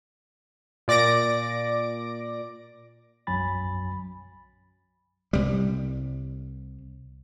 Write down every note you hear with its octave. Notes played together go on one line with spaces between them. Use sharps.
A#2 D5 D6 A#6 D7
B1 F#2 F#3 G#5 B5 A6
C2 G3